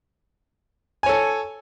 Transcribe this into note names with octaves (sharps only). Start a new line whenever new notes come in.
A4 C#5 G#5